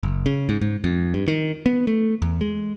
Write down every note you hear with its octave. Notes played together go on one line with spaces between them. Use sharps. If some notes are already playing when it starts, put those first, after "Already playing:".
F#1
C#3
G#2
G#2
F2
G2
D#3
B3
A3
E2
G#3